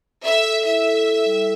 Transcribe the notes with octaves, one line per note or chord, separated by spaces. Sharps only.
A4 E5
A4
E4 E5
A4
A4
G3